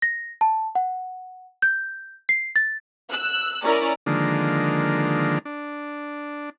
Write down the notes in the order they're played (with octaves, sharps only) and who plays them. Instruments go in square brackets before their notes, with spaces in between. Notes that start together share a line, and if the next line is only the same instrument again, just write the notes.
[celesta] A#6
A5
F#5
G6
C7
A6
[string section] E6 F#6
C#4 E4 A#4 D5 A#5
[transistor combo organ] D3 D#3 F3 G#3 A#3 D4
D4